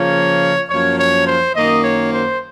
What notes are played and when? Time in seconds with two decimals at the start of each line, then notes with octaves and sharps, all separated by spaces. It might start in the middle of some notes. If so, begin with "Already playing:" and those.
Already playing: C#3 F3 A#3 C#5
0.70 F#2 F3 A#3 C#5
0.98 C#5
1.27 C5
1.56 F#2 D#3 A#3 D#5
1.83 C#5
2.13 C5